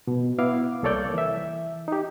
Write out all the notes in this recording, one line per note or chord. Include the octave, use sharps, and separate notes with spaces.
B2
B3 E4 F5 D6
C2 A#3 A4 C#5 D5 G6
E3 E5
D#4 G4